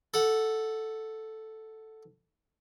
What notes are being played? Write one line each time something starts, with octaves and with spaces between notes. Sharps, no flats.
A4 F#5